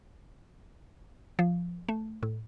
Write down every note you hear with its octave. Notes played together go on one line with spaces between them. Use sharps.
F3
A3
A2